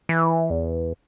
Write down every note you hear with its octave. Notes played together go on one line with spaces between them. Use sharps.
E3
E2